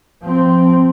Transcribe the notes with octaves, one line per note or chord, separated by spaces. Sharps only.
F3 C4